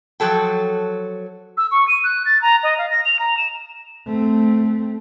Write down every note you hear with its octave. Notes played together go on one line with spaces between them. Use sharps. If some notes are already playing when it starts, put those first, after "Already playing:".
F3 F#3 A4 G5
E6
C#6
D#7
F#6
A6
A#5
D#5
F5
A#6
F7
A#5
E7
A3 C4